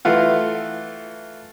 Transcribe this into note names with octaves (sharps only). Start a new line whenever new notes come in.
E3 A3 F4 F#5